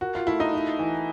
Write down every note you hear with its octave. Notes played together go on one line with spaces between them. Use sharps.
F#4 A#4
F4
A3 E4
D#4
D#4
E3